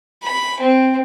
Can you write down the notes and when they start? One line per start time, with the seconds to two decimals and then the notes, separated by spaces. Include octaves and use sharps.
0.23 B5
0.60 C4